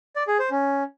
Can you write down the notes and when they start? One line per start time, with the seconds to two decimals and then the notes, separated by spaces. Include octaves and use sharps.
0.16 D5
0.28 G#4
0.39 C5
0.51 C#4